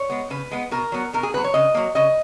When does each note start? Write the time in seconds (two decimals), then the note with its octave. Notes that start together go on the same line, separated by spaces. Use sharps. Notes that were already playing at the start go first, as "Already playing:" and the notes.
Already playing: C#5
0.10 G#3 B3
0.30 C#3 B4
0.51 G#3 B3
0.71 B2 A#4
0.92 F#3 B3
1.13 B2 A#4
1.23 G#4
1.33 F#3 B3 B4
1.44 C#5
1.54 C#3 D#5
1.74 F#3 A#3
1.95 C#3 D#5